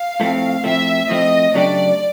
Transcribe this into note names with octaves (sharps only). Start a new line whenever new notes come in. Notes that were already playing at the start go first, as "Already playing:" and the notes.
Already playing: F5
A2 F3 A3 C4
A2 F3 A3 C4 E5
A2 F3 A3 C4 D#5
C#3 F#3 A3 D4 G4 D5